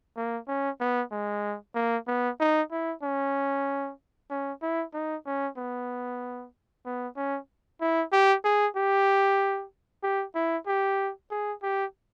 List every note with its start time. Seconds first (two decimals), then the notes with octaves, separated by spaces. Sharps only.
0.17 A#3
0.48 C#4
0.80 B3
1.12 G#3
1.75 A#3
2.07 B3
2.40 D#4
2.71 E4
3.02 C#4
4.30 C#4
4.62 E4
4.94 D#4
5.26 C#4
5.57 B3
6.85 B3
7.16 C#4
7.81 E4
8.12 G4
8.44 G#4
8.76 G4
10.03 G4
10.35 E4
10.67 G4
11.31 G#4
11.63 G4